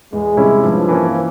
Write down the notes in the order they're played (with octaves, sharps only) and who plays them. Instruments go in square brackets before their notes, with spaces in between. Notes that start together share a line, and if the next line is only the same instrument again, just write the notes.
[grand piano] E2 [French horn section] G#3
[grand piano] C3 G3 C#4 E4
[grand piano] G2 [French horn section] F3
[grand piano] E3 A#3 C#4